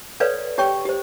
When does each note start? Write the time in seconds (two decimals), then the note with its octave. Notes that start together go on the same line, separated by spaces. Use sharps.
0.20 A4 B4 C#5 D5 F5
0.58 G4 C#5 G5 C#6
0.85 G4 C5